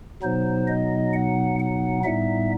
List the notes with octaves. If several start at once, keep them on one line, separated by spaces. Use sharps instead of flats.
B2 F#3 B3 D#4 C5
D#5
F#5
F#5
A2 G3 B3 D#4 E5